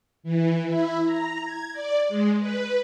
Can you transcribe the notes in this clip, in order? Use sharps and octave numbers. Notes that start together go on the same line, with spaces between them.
E3
E4
A#5
G#6
D5
G#3
B4